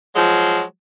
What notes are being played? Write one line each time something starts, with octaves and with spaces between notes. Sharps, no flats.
F3 F#3 G#3